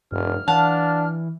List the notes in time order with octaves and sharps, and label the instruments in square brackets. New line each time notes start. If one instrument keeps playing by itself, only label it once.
[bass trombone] F1 [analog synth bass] G2 [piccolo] F6
[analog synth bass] E3 [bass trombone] D4 [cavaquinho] F5 F#5 A5